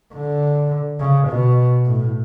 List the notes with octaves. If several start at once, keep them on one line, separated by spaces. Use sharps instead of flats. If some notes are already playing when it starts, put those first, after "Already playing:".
D3
C#3
B2
A2